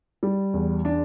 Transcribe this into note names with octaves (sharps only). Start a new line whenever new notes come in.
G3
E2
D4